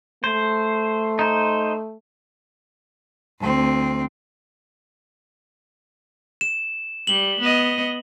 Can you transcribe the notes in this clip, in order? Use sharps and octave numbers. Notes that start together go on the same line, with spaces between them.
A3 C5
D#4 C5
D2 C4
E7
G3 F#7 G7
B3 D#5